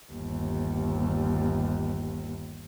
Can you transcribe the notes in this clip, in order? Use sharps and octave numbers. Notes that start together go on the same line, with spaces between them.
G1 D#2